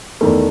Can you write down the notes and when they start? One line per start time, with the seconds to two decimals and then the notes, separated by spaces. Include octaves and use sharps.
0.21 E2 D#3 A3